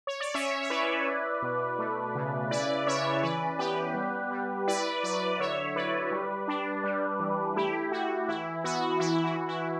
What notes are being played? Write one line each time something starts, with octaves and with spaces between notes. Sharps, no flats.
C#5
D5
C#4 C#5 E5
E5
E4 B4 D5
E4
B2
A3
C#3
E4 B4 D5
C#4 C#5 E5
E3 B4 D5
B3 G4 B4
G3
G3
E4 B4 D5
F#3 B4 D5
D3 C#5 E5
E4 B4 D5
G3
D4
G3
E3
A3 E4 G4
E4 F#4
E3 E4
B3 F#4
E3 E4
F#4
E4
E4